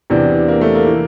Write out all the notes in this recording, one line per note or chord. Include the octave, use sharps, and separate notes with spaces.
E2 C3 E3 D4
A#3
A3
A#3
E3